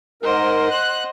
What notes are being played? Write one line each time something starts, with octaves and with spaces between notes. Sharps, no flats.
G#2 A#4 C5 D#5 F#5
F#6